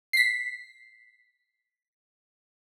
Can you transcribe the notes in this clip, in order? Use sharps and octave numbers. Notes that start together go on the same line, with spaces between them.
B6 C7